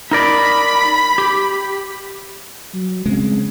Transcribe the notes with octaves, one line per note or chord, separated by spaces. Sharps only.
D#4 A#4 D5 B5
G4
F#3
C#3 G#3 C4